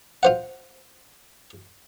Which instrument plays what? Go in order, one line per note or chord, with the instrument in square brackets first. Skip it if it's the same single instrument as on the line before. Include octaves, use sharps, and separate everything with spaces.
[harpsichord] F4 C5 F#5